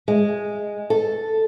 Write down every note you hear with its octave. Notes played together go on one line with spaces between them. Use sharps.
G#3
A4